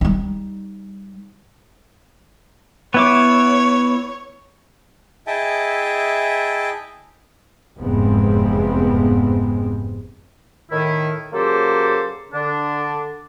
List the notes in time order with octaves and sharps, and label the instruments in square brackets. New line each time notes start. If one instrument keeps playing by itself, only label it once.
[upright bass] G3 D#4
[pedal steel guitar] B3 E4 D6 [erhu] C#5
[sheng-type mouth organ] E4 G#4 D#5 E5 G5 A5
[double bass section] F1 E2 G#2 G#3 B3 C4
[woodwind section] A2 D#3 E4
C#3 F#3 A#3 G4 A4 C5
D3 D4